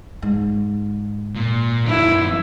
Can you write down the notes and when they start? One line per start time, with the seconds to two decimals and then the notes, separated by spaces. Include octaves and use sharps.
0.22 G#2
1.35 A#2
1.86 F#2 B3 E4